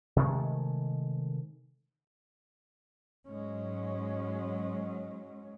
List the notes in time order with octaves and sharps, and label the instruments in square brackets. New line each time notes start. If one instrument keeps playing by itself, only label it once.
[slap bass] C3 D#3 G#3 A3
[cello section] G#2 F#3 [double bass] G#3 C#4